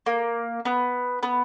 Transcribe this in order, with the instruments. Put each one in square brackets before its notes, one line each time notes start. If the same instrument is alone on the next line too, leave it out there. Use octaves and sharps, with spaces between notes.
[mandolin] A#3
B3
B3